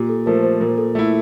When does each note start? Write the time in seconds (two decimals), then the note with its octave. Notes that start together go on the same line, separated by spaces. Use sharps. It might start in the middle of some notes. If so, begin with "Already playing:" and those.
Already playing: A#2 G4
0.09 A4
0.26 F3 A3 A#4
0.43 C5
0.60 A#2 A#4
0.78 A4
0.95 A3 E4 A4